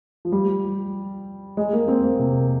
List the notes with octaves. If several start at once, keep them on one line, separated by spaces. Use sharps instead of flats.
F3
G3
G#3
A#3
C4
A#3
C3